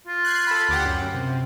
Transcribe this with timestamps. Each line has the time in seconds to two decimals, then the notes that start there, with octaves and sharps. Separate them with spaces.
0.07 F4
0.25 F#6 G#6 C7
0.47 A4 B5
0.69 D2 G4 F#5
0.86 F#2
1.15 C3